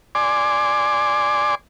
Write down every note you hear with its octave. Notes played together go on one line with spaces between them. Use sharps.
D5 G#5 C6 D6